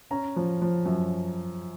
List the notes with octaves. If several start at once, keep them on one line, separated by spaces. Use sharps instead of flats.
C#4 A#5
F3
F3
F#2